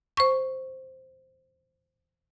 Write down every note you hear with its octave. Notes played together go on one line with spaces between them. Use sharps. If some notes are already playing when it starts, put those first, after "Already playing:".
C5 C#6